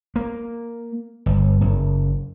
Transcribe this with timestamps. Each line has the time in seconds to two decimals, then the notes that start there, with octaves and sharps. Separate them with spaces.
0.16 A#3
1.26 G1
1.61 F#1